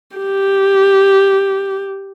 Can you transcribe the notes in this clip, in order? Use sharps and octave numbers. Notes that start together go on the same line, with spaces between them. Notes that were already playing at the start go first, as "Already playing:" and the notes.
G4